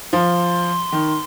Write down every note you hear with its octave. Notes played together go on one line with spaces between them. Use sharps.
F3 C6
D#3